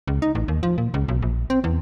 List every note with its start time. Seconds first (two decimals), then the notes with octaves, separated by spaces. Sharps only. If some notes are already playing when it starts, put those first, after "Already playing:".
0.07 C#2
0.22 D#4
0.35 A1
0.48 D#2
0.63 F3
0.78 A#2
0.94 C#2
1.08 B1
1.22 A#1
1.50 C4
1.64 E2